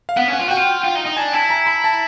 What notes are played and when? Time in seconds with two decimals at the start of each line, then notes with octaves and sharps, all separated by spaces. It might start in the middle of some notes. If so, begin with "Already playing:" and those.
0.09 F5
0.17 B3 F#5
0.28 C#4
0.33 F#5
0.39 F4
0.48 F#4 G5
0.57 F4
0.84 F4
0.95 D#4
1.06 D#4
1.17 D4 G#5
1.33 E4 A5
1.50 A#5
1.67 B5
1.84 A5